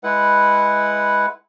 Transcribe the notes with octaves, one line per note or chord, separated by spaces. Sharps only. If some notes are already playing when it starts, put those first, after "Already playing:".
G#3 E4 B4 F#5